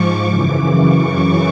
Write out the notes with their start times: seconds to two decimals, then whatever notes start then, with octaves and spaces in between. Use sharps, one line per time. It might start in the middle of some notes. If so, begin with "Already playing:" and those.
Already playing: G#2 F3 C#6 D6
0.25 F#2 C#3 E3 D6
0.74 C#6